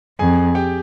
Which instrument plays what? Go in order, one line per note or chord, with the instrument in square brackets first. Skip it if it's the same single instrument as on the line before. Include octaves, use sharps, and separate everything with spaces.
[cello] F2 [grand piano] G#4 G#5
[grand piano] G4 G5